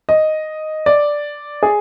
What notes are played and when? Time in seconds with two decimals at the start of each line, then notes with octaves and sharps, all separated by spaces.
0.09 D#5
0.86 D5
1.63 G#4